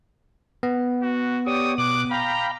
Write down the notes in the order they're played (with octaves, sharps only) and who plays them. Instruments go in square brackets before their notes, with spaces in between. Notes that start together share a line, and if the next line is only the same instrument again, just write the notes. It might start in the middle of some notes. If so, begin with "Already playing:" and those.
[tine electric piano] B3
[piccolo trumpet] F#4
[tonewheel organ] G4 C#5 D5 [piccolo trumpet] D#6
[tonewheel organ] B2 F#6 [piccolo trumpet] D6
[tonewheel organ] F5 G5 B5 [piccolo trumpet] A#5